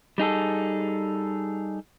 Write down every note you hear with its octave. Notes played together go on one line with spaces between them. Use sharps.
G3 D#4 G#4 A4